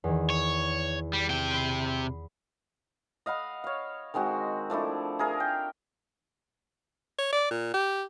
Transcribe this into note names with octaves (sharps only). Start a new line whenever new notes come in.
E2 D#3
C#5
G3
C3 G5
B5 C7
D#5 F5 F#5 B5
C#5 F5
D#3 G#3 C4 F#4
F3 A3 D4 E4
G#4 A#4 E5
G5
C#5
D5
A#2
G4